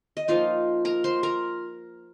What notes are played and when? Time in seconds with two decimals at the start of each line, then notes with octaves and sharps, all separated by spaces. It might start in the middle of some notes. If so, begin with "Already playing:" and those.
0.17 D#5
0.28 F3 A#3 D#4 F4 F5
0.85 A#4 A#5
1.04 C5 C6
1.23 A#4 A#5